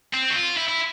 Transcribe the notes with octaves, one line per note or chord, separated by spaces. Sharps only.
C4
F#4
F4
E4
E4